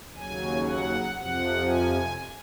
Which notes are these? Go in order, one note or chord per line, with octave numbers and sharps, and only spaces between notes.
D#2 C#3 F#3 G#5
F#5
F2 C3 F3 F#5
G#5